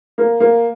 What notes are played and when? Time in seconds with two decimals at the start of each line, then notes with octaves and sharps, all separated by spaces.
0.18 A#3
0.40 A#3